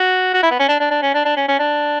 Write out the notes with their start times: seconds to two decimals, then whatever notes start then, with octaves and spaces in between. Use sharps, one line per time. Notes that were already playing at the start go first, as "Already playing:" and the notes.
Already playing: F#4
0.34 F#4
0.43 E4
0.51 B3
0.59 C#4
0.68 D4
0.80 D4
0.91 D4
1.02 C#4
1.14 D4
1.25 D4
1.36 C#4
1.48 C#4
1.60 D4